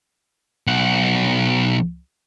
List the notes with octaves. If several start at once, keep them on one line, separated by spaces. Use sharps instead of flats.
B1 F#5